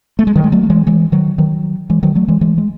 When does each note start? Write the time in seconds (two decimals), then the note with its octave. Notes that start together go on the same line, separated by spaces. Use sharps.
0.19 A3
0.27 G#3
0.36 D#3 F#3
0.44 G#3
0.52 F#3 A3
0.63 A3
0.70 E3 G#3
0.87 E3 G#3
1.12 D#3 F#3
1.38 D#3 F#3
1.90 E3 G#3
2.03 D#3 F#3
2.15 F#3 A3
2.28 E3 G#3
2.41 E3 G#3
2.58 G#3